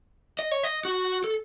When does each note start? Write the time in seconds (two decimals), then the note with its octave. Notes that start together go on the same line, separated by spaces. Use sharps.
0.39 D#5
0.51 C#5
0.63 D#5
0.85 F#4
1.24 A4